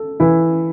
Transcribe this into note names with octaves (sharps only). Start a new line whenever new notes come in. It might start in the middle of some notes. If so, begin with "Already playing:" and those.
Already playing: A4
E3 E4